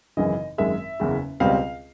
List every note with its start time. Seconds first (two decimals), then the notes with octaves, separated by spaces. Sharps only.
0.17 G#1 F#2 C#3 E3 D#5
0.58 G#1 F#2 D#3 G#3 E5
1.00 F#1 E2 C#3
1.40 C#2 B2 G3 C4 F5